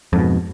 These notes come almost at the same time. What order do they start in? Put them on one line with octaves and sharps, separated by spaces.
F2 G#2 B2